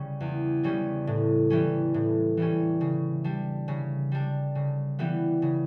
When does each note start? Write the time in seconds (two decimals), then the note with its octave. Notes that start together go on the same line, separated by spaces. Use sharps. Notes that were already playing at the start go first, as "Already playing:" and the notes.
Already playing: C#3 G3 C#4
0.20 E2
0.63 C#3 G3 C#4
1.07 A2
1.50 E3 G3 C#4
1.94 A2
2.37 E3 G3 C#4
2.81 C#3
3.24 G3 D4
3.68 C#3
4.12 G3 D4
4.55 C#3
4.99 E3 G3 B3
5.42 C#3